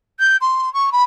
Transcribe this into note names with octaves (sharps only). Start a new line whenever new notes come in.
G6
C6
C#6
B5